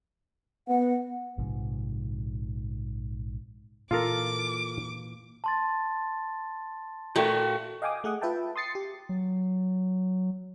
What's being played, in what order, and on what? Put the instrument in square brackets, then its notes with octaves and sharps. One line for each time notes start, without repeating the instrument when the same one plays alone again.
[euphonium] B3 [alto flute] F#5
[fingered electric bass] A#1 G#2 C3 F3
[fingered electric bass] A#2 E3 [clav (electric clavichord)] F4 A4 A#4 [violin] D6
[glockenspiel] A5 C6 A6
[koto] A#2 A3 [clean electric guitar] F#4 G5
[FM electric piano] D#5 F5 G5 G#5 D6 D#6
A3 G#4 F#5 D#6
F4 B4 E5 G5 A5
C6 D#6 A6 C7 C#7
G4
[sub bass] F#3